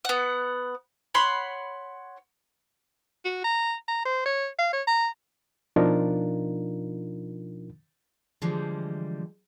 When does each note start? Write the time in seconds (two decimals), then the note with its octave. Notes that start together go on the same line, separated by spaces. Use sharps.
0.05 B3 F#5
1.14 C#5 F#5 B5 C6
3.25 F#4
3.44 A#5
3.88 A#5
4.05 C5
4.25 C#5
4.59 F5
4.73 C#5
4.87 A#5
5.76 B2 F3 D4 D#4 F4 A#4
8.42 D3 E3 F3 G3 G#3